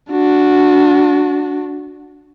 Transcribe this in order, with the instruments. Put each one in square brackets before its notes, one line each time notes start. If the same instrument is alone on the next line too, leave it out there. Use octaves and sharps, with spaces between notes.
[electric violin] D4 F#4